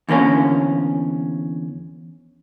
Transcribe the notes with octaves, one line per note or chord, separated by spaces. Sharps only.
E2 D3 A#3 C#4